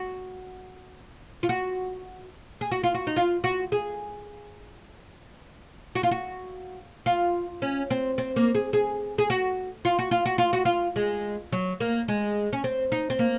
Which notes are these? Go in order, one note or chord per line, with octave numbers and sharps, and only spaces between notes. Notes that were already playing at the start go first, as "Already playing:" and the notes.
Already playing: F#4
F4
F#4
G#4
F#4
F4
F#4
D#4
F4
F#4
G#4
F#4
F4
F#4
F4
C#4
C4
C4
A#3
G#4
G#4
G#4
F#4
F4
F#4
F4
F#4
F4
F#4
F4
G#3
F#3
A#3
G#3
C#4
C4
D#4
C4
A#3